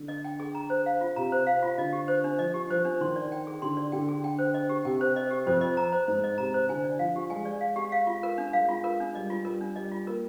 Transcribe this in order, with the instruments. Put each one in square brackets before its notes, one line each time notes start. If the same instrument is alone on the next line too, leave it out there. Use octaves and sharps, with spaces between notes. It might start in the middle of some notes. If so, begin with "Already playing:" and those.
Already playing: [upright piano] D3
[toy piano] D#5
G5
G#4
A#5
C5
F5
F4
[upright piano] C3 [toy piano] A#5
[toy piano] C5
F5
F4
[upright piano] D3 [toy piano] D#5
[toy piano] G4
C5
D4
[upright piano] F3 [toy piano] D#5
[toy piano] G4
[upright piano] F3 [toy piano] C5
[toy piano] D4
[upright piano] D#3 [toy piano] C6
[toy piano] D5
G5
G#4
[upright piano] D3 [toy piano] C6
[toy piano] D5
[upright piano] D3 [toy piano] G5
[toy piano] G#4
G5
C5
D#5
G4
[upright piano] C3 [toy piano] G5
[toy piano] C5
D#5
G4
[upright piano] F2 [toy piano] C5
[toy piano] D#5
A#5
C5
[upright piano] G#2 [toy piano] C5
[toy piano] D#5
[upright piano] C3 [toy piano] A#5
[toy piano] C5
[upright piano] D3 [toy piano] G#5
[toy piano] D5
[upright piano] F3 [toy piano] F5
[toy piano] G4
[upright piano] G#3 [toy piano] G#5
[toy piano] D5
F5
G4
F5
F4
A#4
D4
[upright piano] G#3 [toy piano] F5
[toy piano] F4
A#4
D4
[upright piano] G3 [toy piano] D#5
[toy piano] F4
[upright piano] G3 [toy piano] A#4
[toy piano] D4
[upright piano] G3 [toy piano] D#5
[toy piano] F4
[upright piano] A#3 [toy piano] A#4